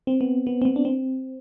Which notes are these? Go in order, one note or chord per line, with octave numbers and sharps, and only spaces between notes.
C4
B3
B3
C4
B3
D4
C4